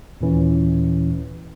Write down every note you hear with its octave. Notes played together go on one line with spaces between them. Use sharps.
D#2 A#2 E3 C#4